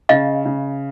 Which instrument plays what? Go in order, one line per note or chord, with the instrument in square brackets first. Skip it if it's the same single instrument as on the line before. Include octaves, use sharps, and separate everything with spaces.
[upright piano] C#3 [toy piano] D#5 F5
[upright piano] C#3